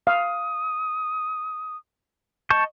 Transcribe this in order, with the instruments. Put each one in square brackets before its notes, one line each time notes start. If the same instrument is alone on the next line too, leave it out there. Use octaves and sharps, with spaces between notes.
[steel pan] F5 [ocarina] D#6
[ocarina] D#5 [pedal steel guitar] A5 C#6 G6